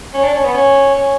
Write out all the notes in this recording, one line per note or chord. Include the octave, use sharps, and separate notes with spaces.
C#4
D4
C#4
B3
C#4
C#4